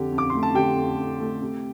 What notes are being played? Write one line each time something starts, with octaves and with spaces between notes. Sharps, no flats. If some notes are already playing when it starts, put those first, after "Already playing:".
Already playing: F2 D3 G4
F2
D6
A3 C6
A5
D3 G4 G5
F2
F2
A3
C3